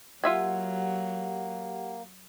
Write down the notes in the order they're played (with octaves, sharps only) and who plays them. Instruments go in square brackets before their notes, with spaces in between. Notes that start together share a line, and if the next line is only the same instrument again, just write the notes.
[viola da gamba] F#3 [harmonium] A#3 [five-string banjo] F4 E5 G#5 [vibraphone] G4 F#5